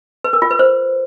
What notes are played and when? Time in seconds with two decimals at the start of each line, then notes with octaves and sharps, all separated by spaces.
0.24 B4
0.33 A#4
0.42 F4
0.51 B4
0.59 C5